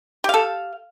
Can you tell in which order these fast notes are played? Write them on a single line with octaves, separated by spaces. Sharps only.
G4 F5 A4